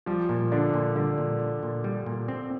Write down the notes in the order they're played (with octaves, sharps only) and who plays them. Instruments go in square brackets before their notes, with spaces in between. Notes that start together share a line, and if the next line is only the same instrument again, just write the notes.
[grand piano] F3 [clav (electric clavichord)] G3
[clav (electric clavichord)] A#2
[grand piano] D3 [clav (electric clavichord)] D4
[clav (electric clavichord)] A#2
[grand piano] D3 [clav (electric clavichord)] G3
[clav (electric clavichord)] A#2
D4
A#2
G3
A#2
C4